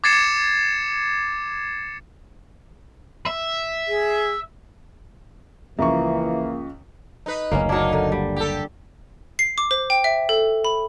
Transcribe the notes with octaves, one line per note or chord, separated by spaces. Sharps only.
D6 G#6 A6 C7 C#7 E7
E5
G#4
C#2 E3 F3 A#3 E5 C#6
D#4 B4
F#1 D2 A#3 C#4
F#3 A#3 D4 D#4
D3
G3
G4 A4
C7
D6
C5
G5
E5
A4
B5